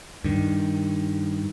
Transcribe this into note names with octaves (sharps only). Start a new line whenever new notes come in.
G2 D#3